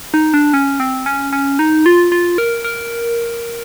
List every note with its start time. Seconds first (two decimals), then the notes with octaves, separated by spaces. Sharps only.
0.14 D#4
0.34 D4
0.54 C#4
0.80 C4
1.06 C#4
1.33 C#4
1.59 D#4
1.86 F4
2.12 F4
2.38 A#4
2.64 A#4